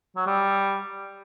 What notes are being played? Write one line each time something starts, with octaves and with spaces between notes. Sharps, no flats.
F#3
G3